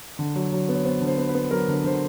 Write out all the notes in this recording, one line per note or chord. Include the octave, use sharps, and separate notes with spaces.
D3
F#3
F#3
B3
C#5
B3 C5
D3
C5
B3
B4
B3
F#3 A#4
D3
A#4
D3 C5